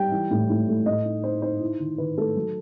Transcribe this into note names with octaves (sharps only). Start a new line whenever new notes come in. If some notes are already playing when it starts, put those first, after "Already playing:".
Already playing: G3 G5
E3
A2
A2
A3
A2 D#5
D#4
D#4 C5
D#4 C5
E4
D#3
D#3 B4
A3 A4
F#3